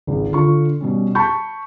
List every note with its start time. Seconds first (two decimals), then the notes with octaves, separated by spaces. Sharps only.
0.07 G#1 C#2
0.32 D3 F4 C#6
0.81 B2 G3 C#4
1.15 A5 B5 C#6 G6